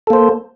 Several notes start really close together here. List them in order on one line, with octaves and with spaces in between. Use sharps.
A4 A#3 C5